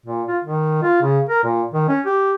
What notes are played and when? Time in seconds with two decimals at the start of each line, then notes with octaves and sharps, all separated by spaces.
0.06 A#2
0.28 F4
0.44 D#3
0.82 F4
1.02 C#3
1.29 A#4
1.44 A#2
1.74 D#3
1.88 C#4
2.06 G4